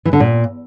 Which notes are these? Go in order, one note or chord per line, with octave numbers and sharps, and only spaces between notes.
E3
D3
A#2